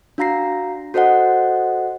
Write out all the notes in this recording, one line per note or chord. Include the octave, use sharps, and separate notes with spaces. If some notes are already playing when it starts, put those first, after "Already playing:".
D4 F#4 F5 A#5 A#6 C7
F#4 A4 C5 D#5 F#5